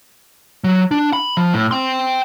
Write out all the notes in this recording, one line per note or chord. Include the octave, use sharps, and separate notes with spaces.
F#3
D4
B5
F3
A2
G5 C6